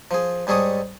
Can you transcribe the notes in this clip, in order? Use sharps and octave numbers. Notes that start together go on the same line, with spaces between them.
F3 G#4
G#2 G3 G#4 A4 C#5 D#6